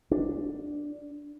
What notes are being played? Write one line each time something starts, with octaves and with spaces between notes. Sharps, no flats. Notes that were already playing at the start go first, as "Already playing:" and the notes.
D4